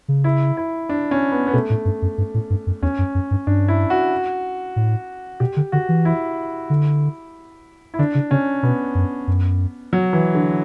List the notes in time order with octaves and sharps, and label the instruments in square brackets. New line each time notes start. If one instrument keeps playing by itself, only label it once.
[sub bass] C#3
[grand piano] E4
E4
D4
C#4
B3
B3
[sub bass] B2 [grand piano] A3
[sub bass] A2
G2
F#2
G2
A2
G2
F#2
[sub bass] E2 [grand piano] C#4
[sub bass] F#2
F#2
G2
[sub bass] G2 [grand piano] D4
[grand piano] E4
F#4
[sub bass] A2
[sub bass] B2 [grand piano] G4
[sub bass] D3
[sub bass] D3 [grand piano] F#4
[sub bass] E3
[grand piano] E4
[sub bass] D3
[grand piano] E4
[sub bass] D3 [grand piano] D4
[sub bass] C#3
[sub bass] C#3 [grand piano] C#4
[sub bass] B2 [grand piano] B3
[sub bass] F#2
F#2
[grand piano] F#3
E3
D3